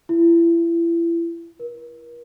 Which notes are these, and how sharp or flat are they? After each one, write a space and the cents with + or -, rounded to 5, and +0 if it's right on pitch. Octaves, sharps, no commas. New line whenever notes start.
E4 +35
A#4 +40